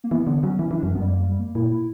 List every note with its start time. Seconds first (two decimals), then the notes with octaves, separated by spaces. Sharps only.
0.04 A#3
0.11 E3 B3
0.27 D3 B3
0.43 F#3 C#4
0.59 E3 C#4
0.71 E3 D4
0.83 F#2 C#4
0.95 F#2 B3
1.01 G3
1.07 A#3
1.23 G3
1.40 A#3
1.55 A#2 E4
1.71 E4